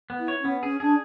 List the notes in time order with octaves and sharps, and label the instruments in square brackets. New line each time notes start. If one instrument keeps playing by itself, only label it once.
[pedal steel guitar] B3
[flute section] E4
[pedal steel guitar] C#5
[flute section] C#4
[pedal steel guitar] B3
[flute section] C#4 [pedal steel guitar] G#4
[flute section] D4 [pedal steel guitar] G#4